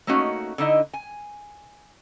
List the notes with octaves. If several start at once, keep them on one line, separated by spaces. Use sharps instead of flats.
A3 A#3 C#4 D#4 F#4
D3 D#4 E4 D#5
G#5